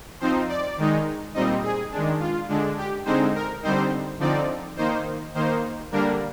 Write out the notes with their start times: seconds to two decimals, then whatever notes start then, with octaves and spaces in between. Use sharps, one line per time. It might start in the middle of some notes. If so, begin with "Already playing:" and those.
0.20 F3 C4 D#4 C5
0.48 D5
0.78 D#3 G#3 D#4
1.34 A#2 G3 C4 D#4 D#5
1.63 G#4
1.92 D#3 G#3 D4
2.20 F4
2.49 D3 G#3 D4
2.78 G4
3.05 D3 G#3 C4 D#4 C5
3.35 A#4
3.63 D3 G3 C4 D#4 C5
4.20 D3 F3 C4 D#4 D5
4.77 D#3 A#3 D#4 C5
5.35 D#3 A#3 D#4 C5
5.92 D3 G3 A#3 D4 A#4